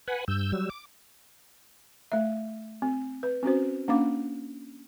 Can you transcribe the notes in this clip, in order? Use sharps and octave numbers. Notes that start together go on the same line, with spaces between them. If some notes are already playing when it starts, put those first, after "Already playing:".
B4 F#5 G#5
G2 E6 G6
F#3 G3 E6
D6
A3 E5
C4
B4
C4 C#4 F#4 C5
A#3 C#4 D4 F5 D6